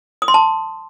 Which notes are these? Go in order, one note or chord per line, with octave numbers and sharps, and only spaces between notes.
D#6
C6
A5